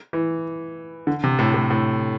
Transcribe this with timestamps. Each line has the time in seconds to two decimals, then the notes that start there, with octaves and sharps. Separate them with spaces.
0.13 E3
1.07 D3
1.24 C3
1.39 A2
1.54 A2
1.70 A2